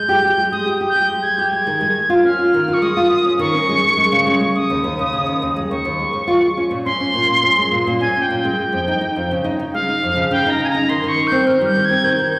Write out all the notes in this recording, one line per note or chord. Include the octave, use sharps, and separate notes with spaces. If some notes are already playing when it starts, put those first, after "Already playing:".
Already playing: G#3 G6
G4
G4
G#3
G#3 D#6
G4
G4
G6
G4
G#3
G#3 G#6
G4 G6
G#3 G#6
D#3
G#3
G#3
F4
C#4 F6
F4
D#3
F4
C#6
G#3 D#6
F4
F4
C#4
D#3 C#6
C#4
G#3
G#3
G#3
C#3
G#3
G#3
G#3 D#6
D#2
D#2
C#3
C#3
D#2
D#2
G#3
D#2 C#6
D#2
G#3
D#2
F4
G#3
C#4
A#2
C#4 C6
C#4
A#2
A#2
C#4
G#3
A#2
A#2
C#4 G#5
C#4
G5
A#2
G#3 G5
G#3
F2
D#4
D#4
F2
C#3
D#4
D#4
G#3 F5
D#4
F2
C#3
C#3 G5
D#4 A#5
C#3 G#5
A#5
D#4
D#3 C6
D#3 C#6
D#4
C4 G6
D#3 F6
G3 G6
D#3
C4 G#6
D#3 G6
D#3